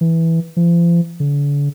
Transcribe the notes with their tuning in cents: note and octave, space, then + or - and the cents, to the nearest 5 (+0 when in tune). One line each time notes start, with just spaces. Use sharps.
E3 -5
F3 -40
D3 -40